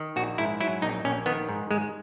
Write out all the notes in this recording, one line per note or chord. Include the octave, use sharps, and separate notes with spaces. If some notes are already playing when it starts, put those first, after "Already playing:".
Already playing: D#3
A#1 F#4
G#2 E4
F#3 E4
A#1 D#4
A#1 C#4
D#3 B3
G#2
G#2 G#3